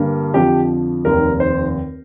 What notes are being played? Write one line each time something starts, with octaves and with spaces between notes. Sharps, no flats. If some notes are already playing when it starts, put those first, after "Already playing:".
Already playing: G2 D3 G3 A#3
F2 D3 F3 G4
F1 D#2 D#3 A#4
C5